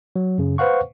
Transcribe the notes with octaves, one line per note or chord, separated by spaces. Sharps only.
F#3
F#2 C#3
B4 C5 F5 F#5 C#6